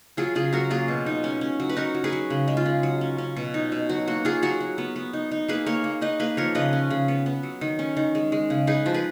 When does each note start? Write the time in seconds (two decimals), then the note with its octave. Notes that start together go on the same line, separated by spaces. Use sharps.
0.17 F#3 F4 G#4
0.35 C#3 F4 G#4
0.53 F#3 F#4 A#4
0.70 A#3 F4 G#4
0.88 B2
1.06 D#4
1.24 C#4
1.41 C#4
1.60 F#3
1.69 B4
1.76 D#4 F#4 A#4
1.95 F#3
2.04 G#4 B4
2.12 F#3
2.30 C#3
2.48 G#3
2.57 F4
2.66 C#3
2.83 F#3
3.01 C#4
3.18 C#4
3.36 B2
3.54 D#4
3.72 B2
3.89 F#3 F#4
4.07 A#3 F#4
4.25 F#3 F4 G#4
4.42 F#3 F#4 A#4
4.60 F#3
4.78 B3
4.96 B3
5.13 D#4
5.31 D#4
5.48 A#3 G#4 B4
5.66 A#3 A#4 C#5
5.84 A#3
6.01 D#4 B4 D#5
6.20 A#3 G#4 B4
6.37 F3 A#4 C#5
6.55 C#3 B4 D#5
6.73 C#4
6.90 C#3
7.08 B3
7.26 B3
7.43 F#3
7.61 D#3
7.79 C#4
7.97 D#3
8.15 G#3
8.32 G#3
8.50 C#3
8.67 D#4 G#4 B4
8.86 F3
8.94 G#4 B4